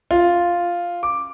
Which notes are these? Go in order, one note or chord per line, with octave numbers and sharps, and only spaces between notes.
F4
D6